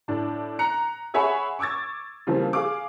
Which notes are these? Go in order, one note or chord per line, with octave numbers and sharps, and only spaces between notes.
A2 D4
A#5 F#6 C#7
G#4 C#5 E5 F#5 G#5 B5
C#6 D6 E6 G#6 A6
C#3 E3 F3 G3 A#3 C4
G#4 F5 D6